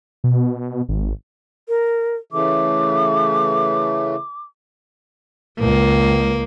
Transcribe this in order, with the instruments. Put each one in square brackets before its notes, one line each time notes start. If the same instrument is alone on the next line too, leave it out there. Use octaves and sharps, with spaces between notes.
[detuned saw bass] B2
G#1
[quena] A#4
[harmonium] C#3 E3 A3 [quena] D6
[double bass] C#2 [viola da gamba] A#3